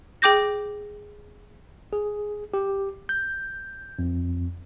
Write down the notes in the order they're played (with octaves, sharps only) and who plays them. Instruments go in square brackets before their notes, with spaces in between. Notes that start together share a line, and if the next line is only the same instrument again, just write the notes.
[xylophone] G#4 G5 D6 G6 A#6
[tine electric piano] G#4
G4
G6
F2